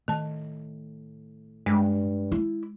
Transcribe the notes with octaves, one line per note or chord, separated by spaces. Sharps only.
A2 D#3 A5
G2 G#3
E4